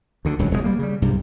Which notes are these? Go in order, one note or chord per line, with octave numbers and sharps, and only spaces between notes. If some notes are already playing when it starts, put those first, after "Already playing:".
D2 D3
D1 C#2 G2 F#3
E1 E2 G2 G#3
G3 A#3
C#3 G3
B1 G2 C3